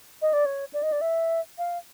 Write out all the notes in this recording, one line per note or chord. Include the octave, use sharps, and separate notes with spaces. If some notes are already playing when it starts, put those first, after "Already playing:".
D#5
D5
C#5
D5
D#5
D5
E5
F5